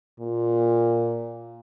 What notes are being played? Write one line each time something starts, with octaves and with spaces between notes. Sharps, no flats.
A#2